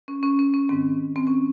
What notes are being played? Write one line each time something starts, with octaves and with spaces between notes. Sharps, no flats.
C#4
C#4
C#4
C#4
G#2 D#3 C4
C4
C#4